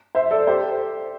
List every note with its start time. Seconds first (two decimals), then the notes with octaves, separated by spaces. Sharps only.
0.15 C5 E5
0.31 A4 D5
0.47 G4 C5